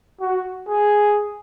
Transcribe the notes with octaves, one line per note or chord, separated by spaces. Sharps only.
F#4
G#4